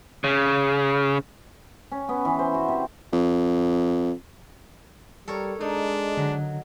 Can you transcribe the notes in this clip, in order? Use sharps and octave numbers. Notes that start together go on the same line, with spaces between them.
C#3
C#4
B3
E3
C5
F#4
C3
F2
G3 A4 A#4 C#5
G#3 D4 D#4
D3 F#3